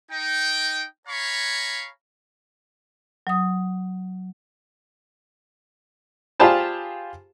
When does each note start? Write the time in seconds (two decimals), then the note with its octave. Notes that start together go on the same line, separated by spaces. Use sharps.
0.12 D#4 G5
1.08 C#5 F5 G#5 A#5 B5 C#6
3.27 F#3 D#6
6.40 F4 G4 G#4 C5 A5 B5